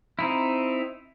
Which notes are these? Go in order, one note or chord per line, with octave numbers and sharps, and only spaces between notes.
C4 D#4 E4